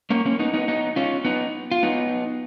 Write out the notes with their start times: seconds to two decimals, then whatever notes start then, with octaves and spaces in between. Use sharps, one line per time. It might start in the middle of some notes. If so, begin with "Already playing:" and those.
0.10 A#3 C#4
0.25 A#3 C#4
0.39 B3 D#4
0.54 B3 D#4
0.68 B3 D#4
0.96 C#4 F4
1.25 B3 D#4
1.71 F4
1.83 B3 D#4